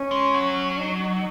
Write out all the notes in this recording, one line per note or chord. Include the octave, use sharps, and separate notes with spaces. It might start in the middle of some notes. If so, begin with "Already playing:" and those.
Already playing: C#4
G#3
F#3
D#4